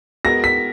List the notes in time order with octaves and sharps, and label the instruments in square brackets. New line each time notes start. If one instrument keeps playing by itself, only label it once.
[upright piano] G#3 B3 F#4 A#4 [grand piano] A#6
[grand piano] B6